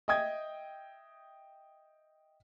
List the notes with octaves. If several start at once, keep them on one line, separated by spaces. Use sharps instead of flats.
D#5 E5 G5 D#6 G#6